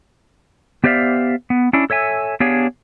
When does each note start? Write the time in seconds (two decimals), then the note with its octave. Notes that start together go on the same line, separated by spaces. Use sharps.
0.84 B3 G4 C5 D5 E5 F5
1.50 B3
1.73 C#4 D4 E4
1.90 A4 C#5 E5 G#5
2.40 B3 D4 G4 G#4 C#5 F5